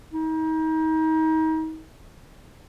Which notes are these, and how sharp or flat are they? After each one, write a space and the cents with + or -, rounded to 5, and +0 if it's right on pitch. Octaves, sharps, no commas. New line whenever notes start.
D#4 +35